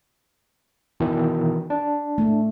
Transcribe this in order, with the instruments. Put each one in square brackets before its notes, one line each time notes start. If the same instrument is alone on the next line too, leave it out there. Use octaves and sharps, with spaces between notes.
[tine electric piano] B2 D#3 E3
D4
[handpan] A3